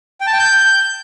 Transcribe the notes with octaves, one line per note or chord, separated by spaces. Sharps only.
G5
A5
G5
G6